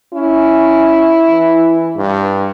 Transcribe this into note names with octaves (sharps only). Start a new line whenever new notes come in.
C#4 E4
E3
G2